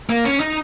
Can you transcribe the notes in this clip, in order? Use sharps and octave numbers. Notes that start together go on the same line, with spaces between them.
A#3
C#4
D#4